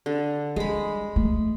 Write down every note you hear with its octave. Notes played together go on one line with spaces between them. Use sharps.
D3
G3 G#3 B5
A3